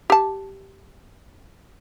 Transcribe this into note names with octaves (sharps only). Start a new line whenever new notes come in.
G4 A5